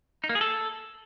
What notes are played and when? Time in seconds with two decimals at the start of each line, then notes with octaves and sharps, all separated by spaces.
0.24 D#4
0.29 A#3
0.35 G#4
0.41 A4